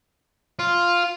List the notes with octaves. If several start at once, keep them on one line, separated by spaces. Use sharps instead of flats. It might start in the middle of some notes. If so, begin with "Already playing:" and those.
F4